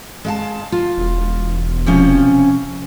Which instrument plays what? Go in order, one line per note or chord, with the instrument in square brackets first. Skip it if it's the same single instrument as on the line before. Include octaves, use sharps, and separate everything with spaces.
[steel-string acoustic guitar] G#3 F5 A5
F4
[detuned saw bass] E1
[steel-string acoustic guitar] C3 F3 C#4